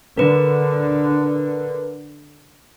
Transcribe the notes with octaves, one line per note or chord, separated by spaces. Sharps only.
D3 A#4 B4